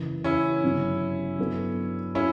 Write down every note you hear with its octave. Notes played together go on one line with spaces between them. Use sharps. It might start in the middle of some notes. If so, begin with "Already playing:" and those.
Already playing: F#1 F#2 E3
C#4 E4
G1 F#2 C#3 F#3
G2 F#3 B3 F#4 A4
B3 C#4 E4 F#4 A4